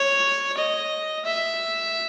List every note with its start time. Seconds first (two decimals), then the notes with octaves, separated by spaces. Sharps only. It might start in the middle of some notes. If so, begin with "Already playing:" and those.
Already playing: C#5
0.58 D#5
1.25 E5